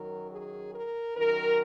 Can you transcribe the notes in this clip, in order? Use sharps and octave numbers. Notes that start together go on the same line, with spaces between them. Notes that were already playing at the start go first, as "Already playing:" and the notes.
Already playing: F#2 D#3 F#3 A#4
G#4
A#4
F#2 D#3 F#3 A#4